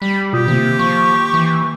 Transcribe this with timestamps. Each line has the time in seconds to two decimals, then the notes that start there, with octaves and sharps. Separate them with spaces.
0.02 G3 B5
0.33 B2 F4 G4 D#6
0.48 C3 D#3 A#3
0.79 F3 C#6
1.34 E3